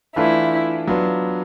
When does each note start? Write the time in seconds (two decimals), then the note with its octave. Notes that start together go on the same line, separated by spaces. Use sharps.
0.16 E3 A3 D4 E4 F4
0.87 F#3 B3 D4 F4